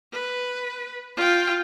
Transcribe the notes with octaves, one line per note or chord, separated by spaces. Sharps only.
B4
F4 G5